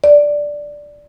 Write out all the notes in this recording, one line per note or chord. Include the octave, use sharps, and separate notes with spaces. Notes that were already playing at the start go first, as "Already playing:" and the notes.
D5